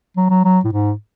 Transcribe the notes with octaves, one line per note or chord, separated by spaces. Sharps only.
F#3
F#3
F#3
A2
G#2